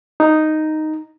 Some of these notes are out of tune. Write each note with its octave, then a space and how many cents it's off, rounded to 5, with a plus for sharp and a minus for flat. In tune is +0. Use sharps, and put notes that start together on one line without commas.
D#4 +0